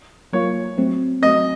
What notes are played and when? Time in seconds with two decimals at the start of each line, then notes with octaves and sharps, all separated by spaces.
0.33 F#3 A#3 F4 C#5
0.78 F#3 A3 C4
1.22 F#3 A3 C4 D#5